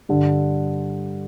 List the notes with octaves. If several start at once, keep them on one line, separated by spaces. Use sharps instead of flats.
G2 D3 G3